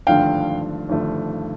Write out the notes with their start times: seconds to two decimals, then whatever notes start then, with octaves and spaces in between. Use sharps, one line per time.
0.07 G#1 G2 D3 F3 A3 F5 G5
0.89 G#1 G2 D3 F3 A3